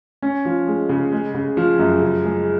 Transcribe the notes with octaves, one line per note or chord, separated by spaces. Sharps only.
C#4
F3
G#3
C#3
G#3
C#3
F3
F#2
C#3
G#3